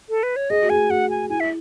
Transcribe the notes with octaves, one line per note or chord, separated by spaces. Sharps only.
A4
B4
C#5
G#4 D#5
F#4
G#4 G#5
F#4 F#5
G#5
E4 G#5
E5